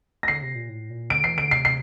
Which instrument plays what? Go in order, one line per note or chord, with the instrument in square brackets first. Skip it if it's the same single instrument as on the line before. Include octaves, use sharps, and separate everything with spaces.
[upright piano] A#6
[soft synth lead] D3 [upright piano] C7
[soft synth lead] C3
A#2
A2
A#2
[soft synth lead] D3 [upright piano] D7
[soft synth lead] E3 [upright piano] C7
[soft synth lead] D3 [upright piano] D7
[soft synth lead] C3 [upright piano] C7
[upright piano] C7